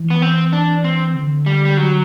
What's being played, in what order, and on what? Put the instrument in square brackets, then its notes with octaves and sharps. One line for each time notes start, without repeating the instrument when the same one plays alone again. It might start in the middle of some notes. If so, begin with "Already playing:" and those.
Already playing: [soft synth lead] E3
[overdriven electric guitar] B3
C4
D4
C4
[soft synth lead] D3
[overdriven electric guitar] G3
G3
F#3